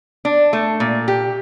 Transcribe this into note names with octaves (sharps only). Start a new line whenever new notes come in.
D4
A3
A#2
G4